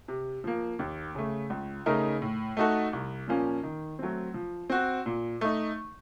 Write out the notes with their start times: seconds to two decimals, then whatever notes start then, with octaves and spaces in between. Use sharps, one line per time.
0.08 C3
0.44 F3 A#3
0.79 D#2
1.15 C#3 A3
1.50 C#2
1.86 C#3 A3 D#4 A#4
2.22 A2
2.57 A3 D#4 F#4 A4
2.93 C2
3.28 A#2 F3 A#3 C#4
3.63 D#3
3.99 F#3 A3 C4
4.34 F3
4.70 C4 F#4
5.06 A#2
5.41 A3 D#4